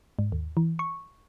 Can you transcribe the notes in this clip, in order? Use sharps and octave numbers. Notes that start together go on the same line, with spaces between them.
G#2
D#2
E3
C#6